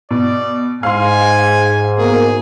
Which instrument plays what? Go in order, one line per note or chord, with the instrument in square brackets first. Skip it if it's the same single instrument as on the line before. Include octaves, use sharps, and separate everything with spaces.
[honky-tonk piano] B2 [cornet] D5
[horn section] G#2 [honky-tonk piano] F5 C6 [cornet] G#5
[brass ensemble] B2 A#3 [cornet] G#4